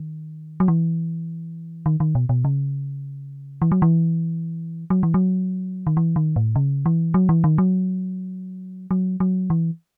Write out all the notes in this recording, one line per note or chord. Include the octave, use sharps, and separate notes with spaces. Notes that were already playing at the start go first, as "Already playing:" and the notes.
Already playing: D#3
F#3
E3
D#3
D#3
B2
B2
C#3
E3
F#3
E3
F#3
E3
F#3
D#3
E3
D#3
A2
C#3
E3
F#3
E3
D#3
F#3
F#3
F#3
E3